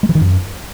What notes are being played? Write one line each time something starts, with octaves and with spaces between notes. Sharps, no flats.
G#3
E3
D#3
F#2